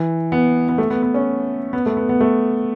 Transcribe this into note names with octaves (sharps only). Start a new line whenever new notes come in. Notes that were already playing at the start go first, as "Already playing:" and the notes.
Already playing: E3
B3
B3
A3
B3
B3
C#4
B3
A3
B3
B3
A3